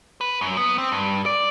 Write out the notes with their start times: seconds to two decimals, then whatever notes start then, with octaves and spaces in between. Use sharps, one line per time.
0.21 B4
0.41 F#2
0.57 B3
0.78 C4
0.92 G2
1.26 D5